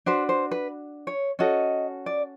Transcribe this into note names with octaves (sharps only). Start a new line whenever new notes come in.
D4 F#4 B4 C5
C5
B4
C#5
C#4 F#4 A4 D#5
D5